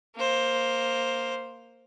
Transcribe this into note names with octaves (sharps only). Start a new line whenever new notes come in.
A#3 C5